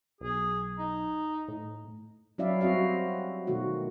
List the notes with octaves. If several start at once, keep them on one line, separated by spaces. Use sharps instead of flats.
B1 G#4
D#4
A2
F#3 C#4 E4 D5 E5 F5
G3 C4 F#4 D#5 F5
B2 D#3 A3 F#4